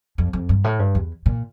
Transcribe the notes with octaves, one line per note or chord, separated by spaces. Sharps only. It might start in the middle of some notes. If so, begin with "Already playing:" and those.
F2
F2
G2
A2
G2
E2
A#2